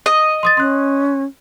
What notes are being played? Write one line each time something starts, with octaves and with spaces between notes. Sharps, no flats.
D#5
C6 D#6 A6
C#4 C6 F#6